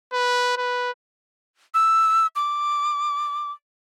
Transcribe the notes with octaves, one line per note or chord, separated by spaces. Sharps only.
B4
B4
E6
D6